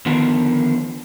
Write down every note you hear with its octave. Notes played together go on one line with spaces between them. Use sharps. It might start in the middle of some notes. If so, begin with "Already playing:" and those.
D3 D#3 F3 B3 A#4